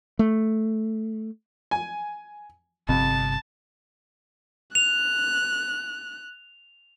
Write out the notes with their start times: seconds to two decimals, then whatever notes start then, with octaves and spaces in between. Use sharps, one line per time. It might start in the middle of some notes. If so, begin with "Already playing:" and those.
0.19 A3
1.71 G#5
2.89 G1 F2 C3 A5
4.75 F#6 F7